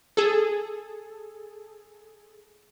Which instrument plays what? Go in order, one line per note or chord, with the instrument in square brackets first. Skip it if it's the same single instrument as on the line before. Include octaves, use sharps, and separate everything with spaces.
[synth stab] G#4 A4